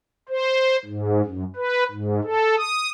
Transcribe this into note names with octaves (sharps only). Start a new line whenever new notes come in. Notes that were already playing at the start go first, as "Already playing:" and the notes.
C5
G#2
F#2
B4
G#2
A4
D#6